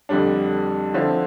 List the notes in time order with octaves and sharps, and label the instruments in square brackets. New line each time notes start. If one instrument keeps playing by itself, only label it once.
[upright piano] F2 D3 G3 D4
D3 F3 C4 E4